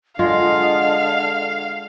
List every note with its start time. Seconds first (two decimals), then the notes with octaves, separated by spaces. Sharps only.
0.19 D3 G#3 F4 D#5 F5